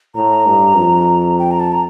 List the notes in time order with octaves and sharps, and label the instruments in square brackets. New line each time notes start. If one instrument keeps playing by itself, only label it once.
[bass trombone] A2 [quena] A#5
[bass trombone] G2
F2
[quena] G5
A#5
A5
A#5